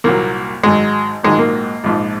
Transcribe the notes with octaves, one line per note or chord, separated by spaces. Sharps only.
C2 A#2 F#3 A#3
G#1 G#2 F#3 G#3
A#1 G#2 D#3 F#3 G#3
A#3
A#1 G#2 F3